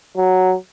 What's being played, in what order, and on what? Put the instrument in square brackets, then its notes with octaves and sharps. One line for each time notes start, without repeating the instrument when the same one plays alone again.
[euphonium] F#3